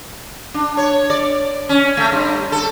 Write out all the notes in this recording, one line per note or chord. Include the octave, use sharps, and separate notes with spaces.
D4
C#5
D5
C#4
A3
G2
A4